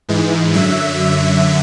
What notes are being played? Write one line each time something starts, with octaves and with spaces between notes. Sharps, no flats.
G#2 E3 G#3
F#2 D3 F#3 E5